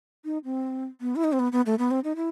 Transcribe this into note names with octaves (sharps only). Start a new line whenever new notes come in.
D#4
C4
B3
E4
D#4
C4
B3
B3
A3
B3
C4
D#4
E4